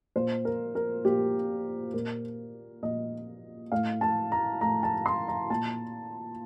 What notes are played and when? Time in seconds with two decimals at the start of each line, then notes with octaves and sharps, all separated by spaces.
0.16 A#2 C5
0.45 A#4
0.75 A#4
1.05 A#2 G4
1.94 A#2 A#4
2.83 A#2 D#5
3.72 A2 F5
4.01 A5
4.32 A#5
4.61 A2 A#5
4.83 A5
5.06 C6
5.28 A#5
5.50 A#2 A5